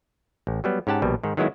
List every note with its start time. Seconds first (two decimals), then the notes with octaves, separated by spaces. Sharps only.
0.47 A1
0.64 F#3 G3 B3
0.87 G#2 C#4 G4 F#5 A5
1.02 A#1 B2 G3
1.23 G#2 D#3
1.37 D#3 F#3 G#3 B3 E4